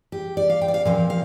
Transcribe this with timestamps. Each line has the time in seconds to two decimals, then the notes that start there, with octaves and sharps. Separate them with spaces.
0.12 G4
0.37 D5
0.50 F5
0.62 G5
0.68 D5
0.74 F5
0.85 A#2 F3 C4 F5
1.10 F5